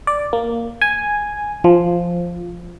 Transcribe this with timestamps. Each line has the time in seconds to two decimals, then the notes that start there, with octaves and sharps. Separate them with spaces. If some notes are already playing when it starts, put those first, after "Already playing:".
0.07 D5
0.33 A#3
0.81 G#5
1.64 F3